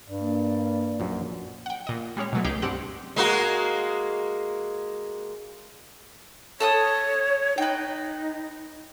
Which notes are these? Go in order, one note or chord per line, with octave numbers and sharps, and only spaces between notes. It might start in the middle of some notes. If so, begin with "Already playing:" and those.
G2 D5
A#3
A#1 F#2
F#5 G5
A#2 D#5
G3 G#3 C#4 C#5
B2 F#3 A3
C#2 D#4 G4 G#4 G5 D6
G2 C4 G4 F#5 D7
G#3 A#3 F#4
A4 C#5 A5 D#6
D#4 B4 G5